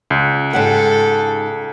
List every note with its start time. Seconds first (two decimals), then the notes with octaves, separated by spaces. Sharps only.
0.10 C#2
0.53 G#2 G4 A4 F#5